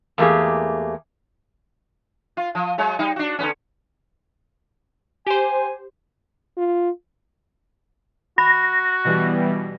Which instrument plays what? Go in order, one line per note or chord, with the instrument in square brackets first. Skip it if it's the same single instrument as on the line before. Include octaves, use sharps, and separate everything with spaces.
[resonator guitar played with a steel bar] E2 A3 A#3 G4 G#4
[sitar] F4
F3
F#3 G#3 C#5
G3 D#4
D4 F#4
D3 B3 C#4
[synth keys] G4 C5 [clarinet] G#5
[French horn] F4
[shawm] F#4 [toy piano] B5 [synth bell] A#6
[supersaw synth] B2 E3 G3